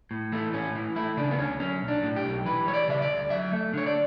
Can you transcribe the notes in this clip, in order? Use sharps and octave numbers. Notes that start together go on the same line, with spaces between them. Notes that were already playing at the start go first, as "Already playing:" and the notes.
A2
E3 A3
A2 C#4
E3
A3 E4
C#3 D4
B3
D2 C#4
F#3 C#4
B1
D4
A2
G4
B1
E3 B4
G3 C#5
D5
C#3 E5
D5
D2
F#3 E5
A3
D3 C#5
D5